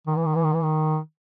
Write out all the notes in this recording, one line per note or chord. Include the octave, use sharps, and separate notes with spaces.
D#3
E3
D#3
E3
D#3
E3
D#3